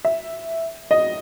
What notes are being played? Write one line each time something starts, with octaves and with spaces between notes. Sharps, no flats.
E5
D#5